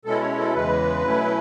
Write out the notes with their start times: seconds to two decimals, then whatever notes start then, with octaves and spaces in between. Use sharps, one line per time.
0.05 B2 G#3 C#4 E4 A4
0.21 C#5
0.38 A4
0.54 E2 C#3 E3 G#3 B4
1.03 B2 F#3 A3 C#4 E4